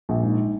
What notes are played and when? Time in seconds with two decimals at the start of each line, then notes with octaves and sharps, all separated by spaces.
0.09 A#1
0.23 G#2